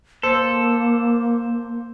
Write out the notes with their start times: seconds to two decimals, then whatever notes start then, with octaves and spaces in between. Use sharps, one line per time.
0.23 A#3 A4 C5